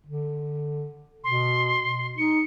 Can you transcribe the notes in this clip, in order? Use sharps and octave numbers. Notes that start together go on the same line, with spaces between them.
D3
B2 C6
D#4 C#7